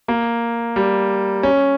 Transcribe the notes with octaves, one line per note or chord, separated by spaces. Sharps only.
A#3
G3
C#4